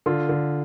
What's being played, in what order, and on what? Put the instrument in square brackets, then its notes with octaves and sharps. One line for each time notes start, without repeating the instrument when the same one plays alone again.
[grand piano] D3 F4
D3